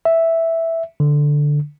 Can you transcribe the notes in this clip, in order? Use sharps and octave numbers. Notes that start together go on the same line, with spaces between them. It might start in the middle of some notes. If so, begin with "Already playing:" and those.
E5
D3